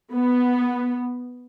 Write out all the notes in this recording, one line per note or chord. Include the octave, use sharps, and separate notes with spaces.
B3